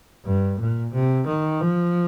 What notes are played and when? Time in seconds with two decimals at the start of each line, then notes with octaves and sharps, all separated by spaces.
0.25 G2
0.59 A#2
0.93 C3
1.27 D#3
1.61 F3